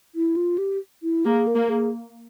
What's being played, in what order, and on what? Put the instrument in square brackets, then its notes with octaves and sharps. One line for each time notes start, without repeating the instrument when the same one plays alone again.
[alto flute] E4
F4
G4
E4
[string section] A#3 [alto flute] G#4
[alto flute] A#4
[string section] A#3
[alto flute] G#4